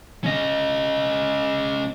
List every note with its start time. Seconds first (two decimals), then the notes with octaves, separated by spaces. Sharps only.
0.24 C#4 D#5